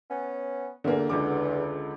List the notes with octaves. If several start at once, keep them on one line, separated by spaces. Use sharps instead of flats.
B3 C#4
E2 D3 A#3
C#2 D3 D6